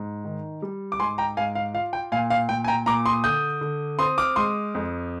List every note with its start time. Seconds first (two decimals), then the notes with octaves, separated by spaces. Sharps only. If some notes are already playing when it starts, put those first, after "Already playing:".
Already playing: G#2
0.25 D#3
0.62 G3
0.92 D6
1.00 G#2 G#5 C6
1.18 G5 A#5
1.37 G#2 F5 G#5
1.55 F5
1.74 F4 F5
1.93 G5
2.12 A#2 F5 G#5
2.30 F5
2.49 A#2 G5
2.65 G#5
2.68 G5 A#5
2.86 A#2 A#5 D6
3.05 C6 D#6
3.24 D3 D#6 G6
3.61 D3
3.99 C4 C6 D#6
4.18 D6 F6
4.36 G#3 C6 D#6
4.75 F2